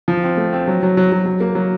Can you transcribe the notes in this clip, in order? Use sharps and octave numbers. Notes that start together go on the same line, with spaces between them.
F3
C4
A3
C4
F#3
F#3
F#3
F#3
F#3
A#3
F#3